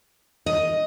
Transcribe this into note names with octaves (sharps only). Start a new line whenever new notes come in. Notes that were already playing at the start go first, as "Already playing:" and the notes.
D#5